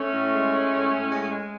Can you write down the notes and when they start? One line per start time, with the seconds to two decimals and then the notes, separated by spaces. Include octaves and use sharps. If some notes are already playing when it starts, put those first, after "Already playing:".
Already playing: A3 C#4
0.13 A2
0.32 G#3
0.52 G#3
0.72 A2
0.91 A2
1.11 G#3
1.31 G#3